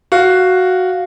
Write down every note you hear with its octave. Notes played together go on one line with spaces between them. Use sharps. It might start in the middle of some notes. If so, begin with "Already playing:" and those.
F#4 F5